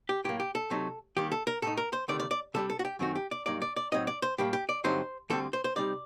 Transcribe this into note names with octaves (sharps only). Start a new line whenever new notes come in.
G4
A2 F#3 A#3 G4
G4
A4
C3 F#3 A3 D#4
D#2 D#3 G3 G4
A4
A#4
A2 A3 D#4 A4
A#4
C5
D2 C3 D#3 A3 D5
D5
D5
C3 G3 D4 A4
A4
F#4
G4
F#2 D#3 A3 C4 D#4 F#4
G4
D5
G2 F#3 A#3 D#4 D5
D5
D5
A2 F#3 C4 D#4 D#5
D5
C5
A2 G3 A#3 D4 G4
G4
D5
G2 D3 F#3 C4 D#4 C5
D2 D3 G3 C4 A4
C5
C5
C3 G3 C4 D#4 D5